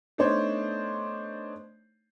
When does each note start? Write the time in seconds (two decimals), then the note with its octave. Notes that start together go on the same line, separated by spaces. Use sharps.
0.18 A3 B3 D4 D#4 C5 C#5